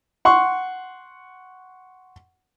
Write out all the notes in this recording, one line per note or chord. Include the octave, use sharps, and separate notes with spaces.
F#5 C6 C#6